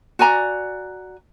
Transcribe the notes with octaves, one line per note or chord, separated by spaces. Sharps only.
F#4 D5 G#5 A#5